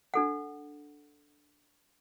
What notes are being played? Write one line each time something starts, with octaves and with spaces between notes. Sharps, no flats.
D4 A4 F#5